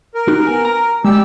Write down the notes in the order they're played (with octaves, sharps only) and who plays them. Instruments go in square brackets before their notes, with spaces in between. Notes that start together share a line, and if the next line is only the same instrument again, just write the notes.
[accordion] A#4
[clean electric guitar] D#4 F#4 G4
B3 G#5
A#5
[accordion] G3 G4 E6 [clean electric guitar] G#3